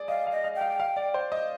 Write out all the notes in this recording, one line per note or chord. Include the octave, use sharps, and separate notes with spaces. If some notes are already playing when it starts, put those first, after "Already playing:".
Already playing: G#4 D5
D#5 F5
F5
D#5
F5
G5
F5
F5
D5
C5
D#5